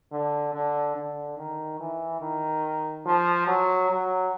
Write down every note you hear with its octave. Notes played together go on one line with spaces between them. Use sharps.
D3
D3
D3
D#3
E3
D#3
F3
F#3
F#3